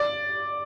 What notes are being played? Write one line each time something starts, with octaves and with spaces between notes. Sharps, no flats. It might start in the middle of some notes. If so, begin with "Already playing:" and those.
Already playing: D5